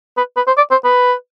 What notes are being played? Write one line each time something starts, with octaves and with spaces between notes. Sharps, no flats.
B4
B4
C5
D5
C5
B4